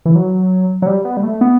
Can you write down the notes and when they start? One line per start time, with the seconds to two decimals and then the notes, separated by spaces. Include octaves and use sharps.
0.05 E3
0.15 F#3
0.82 F#3
0.86 G3
1.05 B3
1.17 G3
1.23 A3
1.41 B3